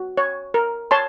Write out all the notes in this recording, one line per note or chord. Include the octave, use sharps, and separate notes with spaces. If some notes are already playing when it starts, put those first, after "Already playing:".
Already playing: F#4
C#5
A#4
C#5 A5 C6